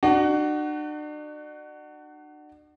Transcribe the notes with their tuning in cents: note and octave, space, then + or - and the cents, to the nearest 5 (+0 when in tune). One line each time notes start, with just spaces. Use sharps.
D4 +40 F#4 +15